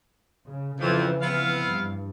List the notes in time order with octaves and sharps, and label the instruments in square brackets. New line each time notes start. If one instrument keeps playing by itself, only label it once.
[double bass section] C#3
[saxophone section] F2 [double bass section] C#3 E3 F3
[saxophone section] B3 C4 F5
[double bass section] G2